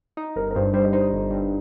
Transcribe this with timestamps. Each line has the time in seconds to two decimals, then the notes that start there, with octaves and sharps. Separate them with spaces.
0.17 D#4
0.36 G1 A#4
0.51 A#4
0.55 G2 C5
0.73 G3 C5
0.83 D#5
0.92 D#4 C5
1.12 G1
1.31 G2